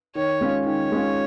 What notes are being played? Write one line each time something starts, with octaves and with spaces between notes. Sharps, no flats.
D#3 C#5
G#3 C#4 F4
D#3 C#5
G#3 C#4 F4